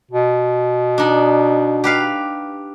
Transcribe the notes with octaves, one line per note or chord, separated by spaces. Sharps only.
B2
D4 D#4
G4 B4 F5